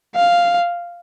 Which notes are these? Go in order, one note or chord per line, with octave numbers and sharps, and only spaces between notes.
F5